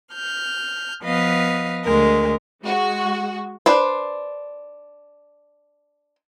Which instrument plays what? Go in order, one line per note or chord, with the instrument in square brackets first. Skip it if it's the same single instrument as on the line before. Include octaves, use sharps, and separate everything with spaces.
[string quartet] F6 G6
F3 B3 B4 D#5 F5
D2 G#3 A#4
[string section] G#3 F#4
[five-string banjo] D4 B4 C5